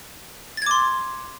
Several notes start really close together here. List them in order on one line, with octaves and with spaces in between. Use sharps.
A6 G#6 D6 C6